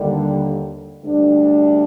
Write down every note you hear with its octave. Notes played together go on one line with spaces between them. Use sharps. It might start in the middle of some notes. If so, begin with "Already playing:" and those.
Already playing: D#2 D3 G3
D2 D3 G3 D4